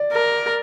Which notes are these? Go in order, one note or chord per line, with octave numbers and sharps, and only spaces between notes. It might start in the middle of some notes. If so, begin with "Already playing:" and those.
Already playing: D5
A#4